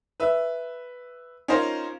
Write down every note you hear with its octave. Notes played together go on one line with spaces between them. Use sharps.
B4 E5
C#4 D#4 F4 A#4 C5